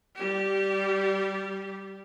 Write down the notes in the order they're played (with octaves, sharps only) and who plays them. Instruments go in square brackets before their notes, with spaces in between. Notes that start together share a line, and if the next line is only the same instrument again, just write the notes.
[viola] G3 G4